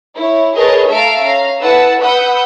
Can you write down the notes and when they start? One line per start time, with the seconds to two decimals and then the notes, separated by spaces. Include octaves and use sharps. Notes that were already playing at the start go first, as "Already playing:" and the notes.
0.16 E4 C#5
0.57 G#4 A#4 B4 C#5 D#5 A5
0.88 A3 A4 E5 F5 A#5 D7
1.20 C#4 F5 A#5
1.61 E4 A4 B4 F#5 A5 E6
2.00 B4 F#5 B5 D#6 E6 G6